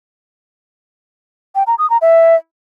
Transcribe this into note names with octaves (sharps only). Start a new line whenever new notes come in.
G5
A#5
D#6
A#5
E5